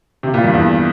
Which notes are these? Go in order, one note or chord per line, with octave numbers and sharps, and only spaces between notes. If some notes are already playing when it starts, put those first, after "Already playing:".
C3
A#2
G2
E2